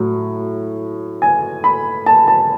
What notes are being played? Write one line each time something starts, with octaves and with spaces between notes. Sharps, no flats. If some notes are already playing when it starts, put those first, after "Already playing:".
Already playing: A2 F#3
G#5
B5
A5
A5